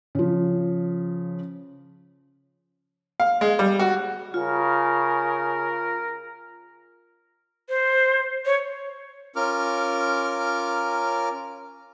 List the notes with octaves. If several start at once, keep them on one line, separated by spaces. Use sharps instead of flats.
C#3 F3
F5
G#3
G3
F#4
C#3 F4 A#4
C5
C#5
C#4 F4 A#4 D6 F6